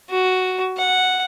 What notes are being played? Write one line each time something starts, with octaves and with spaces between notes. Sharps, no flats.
F#4
F#5